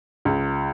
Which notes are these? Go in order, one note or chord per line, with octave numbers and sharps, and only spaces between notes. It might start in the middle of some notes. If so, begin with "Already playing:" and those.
C#2